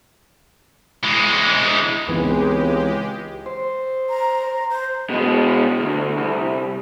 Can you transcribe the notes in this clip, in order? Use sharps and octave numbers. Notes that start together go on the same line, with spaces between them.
E3 G#3
C#2 E3 G#3 B3 C4 D#4 G4
C5
A#5
C5
B2 G#3
D2
C2